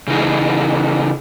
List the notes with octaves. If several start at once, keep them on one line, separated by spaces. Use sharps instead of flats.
C#3 E3 D#4 G#4